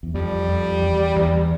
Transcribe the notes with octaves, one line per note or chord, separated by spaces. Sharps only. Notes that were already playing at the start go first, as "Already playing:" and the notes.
E2
F2 G3
F2
E2
E2